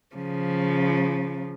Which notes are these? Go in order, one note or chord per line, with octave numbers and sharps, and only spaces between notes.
C#3 F3